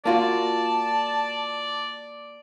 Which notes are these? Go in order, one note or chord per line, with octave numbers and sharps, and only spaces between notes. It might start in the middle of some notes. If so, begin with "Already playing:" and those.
A#3 F4 F#4 D5 A5